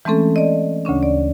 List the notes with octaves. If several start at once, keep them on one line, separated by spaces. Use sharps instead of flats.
E3 G#3 A3 C4 C#4 A4
D5 D#5
D2 C#3 C#4 D4
D5